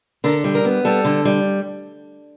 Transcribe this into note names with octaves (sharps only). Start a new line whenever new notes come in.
D3 A#4
G3
A#4
B3
G3 A4
D3
G3